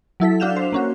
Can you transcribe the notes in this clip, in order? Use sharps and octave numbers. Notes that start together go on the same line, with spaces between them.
F#3 E4 A4 B6
D4 F#4 F5 G6 E7 F7
C5
A#3 C#4 F#4